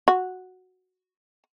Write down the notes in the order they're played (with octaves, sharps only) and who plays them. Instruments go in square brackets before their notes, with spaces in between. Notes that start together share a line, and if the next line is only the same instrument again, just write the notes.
[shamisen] F#4